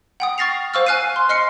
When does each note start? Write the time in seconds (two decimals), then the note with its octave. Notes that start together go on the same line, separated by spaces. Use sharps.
0.20 F#5 G5 D#6
0.38 C#6 F6 A6 A#6 C7 F7
0.74 C5 F5 C#6 E6 F6
0.86 G#5 F6 F#6 C7 D#7
1.16 C6
1.29 D#5 C6 F6 C7 C#7